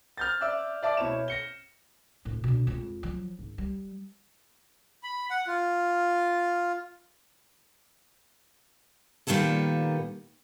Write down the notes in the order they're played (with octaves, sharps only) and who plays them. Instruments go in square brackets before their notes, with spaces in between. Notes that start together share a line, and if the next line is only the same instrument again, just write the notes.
[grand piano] F6 G6 A6
D5 E5 D6 E6 F#6
D5 E5 A5 D6
B2 E4 C#5 E7
A#6 C#7 G7
[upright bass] D#1 A2
B2 D3
F2 G#3
F3 F#3
G#1
G3
[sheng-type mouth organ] B5
F#5
F4
[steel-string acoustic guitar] A#2 D#3 G3 A#3 B3 A4